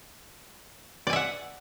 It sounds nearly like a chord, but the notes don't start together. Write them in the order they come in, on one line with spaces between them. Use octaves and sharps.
D5 G#5 E5 F#5